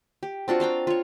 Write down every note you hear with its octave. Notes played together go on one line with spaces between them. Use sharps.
G4
C4 D4 F4 F#4
C5 F5 G5 A#5
F4 C#5